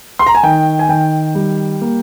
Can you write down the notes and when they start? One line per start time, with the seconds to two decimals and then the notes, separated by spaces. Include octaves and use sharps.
0.19 C6
0.27 A#5
0.35 G#5
0.43 D#3 G5
0.79 G#5
0.89 D#3 G5
1.35 G3
1.81 A#3